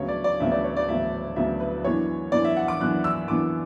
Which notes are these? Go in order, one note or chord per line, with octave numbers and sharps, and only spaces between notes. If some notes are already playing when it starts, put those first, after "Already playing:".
Already playing: D2 C#3 F#3 B3 C#5
D5
D5
D2 C#3 F#3 B3 E5
D5
C#5
D5
D2 C#3 F#3 B3 E5
D2 C#3 F#3 B3 E5
B4
F#2 E3 B3 D4 C#5
F#2 E3 B3 D4 D5
E5
F#5
D6
F#2 E3 B3 D4 F#6
E6
F#2 E3 B3 D4 D6